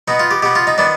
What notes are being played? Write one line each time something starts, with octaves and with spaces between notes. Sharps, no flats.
B2 B3 D#4
F4
G4
B2 B3 G4
F4
D#4
D#3 B3 D4